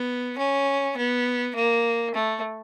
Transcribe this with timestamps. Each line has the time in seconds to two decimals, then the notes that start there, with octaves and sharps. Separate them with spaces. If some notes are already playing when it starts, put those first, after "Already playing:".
Already playing: B3
0.38 C#4
0.97 B3
1.55 A#3
2.14 A3